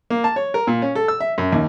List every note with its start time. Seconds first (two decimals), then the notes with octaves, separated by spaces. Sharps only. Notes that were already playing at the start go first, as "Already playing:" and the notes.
0.10 A#3
0.24 A5
0.36 C#5
0.54 A#4
0.67 A#2
0.82 C#4
0.95 A4
1.08 E6
1.21 E5
1.38 F#2
1.52 D#2